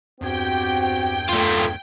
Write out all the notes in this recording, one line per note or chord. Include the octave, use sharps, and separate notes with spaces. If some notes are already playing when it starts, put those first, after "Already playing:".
E2 G2 C4 F#4 G4 G5 G#6
A3 F4